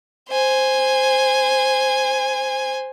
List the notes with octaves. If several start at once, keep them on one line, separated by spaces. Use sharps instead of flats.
C5 G#5